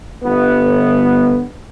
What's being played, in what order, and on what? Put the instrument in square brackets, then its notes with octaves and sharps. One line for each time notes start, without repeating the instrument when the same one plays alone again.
[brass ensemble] G1 B3